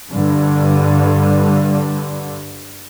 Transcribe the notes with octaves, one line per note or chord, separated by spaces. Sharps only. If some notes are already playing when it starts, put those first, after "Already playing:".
G2 D3